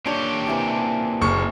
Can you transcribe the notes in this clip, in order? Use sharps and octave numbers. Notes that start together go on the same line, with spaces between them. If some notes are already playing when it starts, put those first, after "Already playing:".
A#2 D4 G4 C#5
C3 E3 A5
F#1 C#6